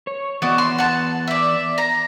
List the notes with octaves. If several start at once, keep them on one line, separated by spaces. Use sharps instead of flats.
C#5
E3 B3 F#4 D5 D#5
C6
F#5 A5
D5 E5
A#5